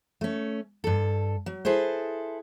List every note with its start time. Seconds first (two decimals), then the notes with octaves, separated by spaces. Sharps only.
0.21 A3 C#4
0.84 G2 A4
1.46 F#3
1.65 E4 G#4 A4 B4 C5